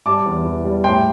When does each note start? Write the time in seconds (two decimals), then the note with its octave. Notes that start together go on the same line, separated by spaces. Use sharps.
0.06 G3 A5 D6
0.26 E2
0.45 E3
0.65 G3
0.84 A2 G5 C6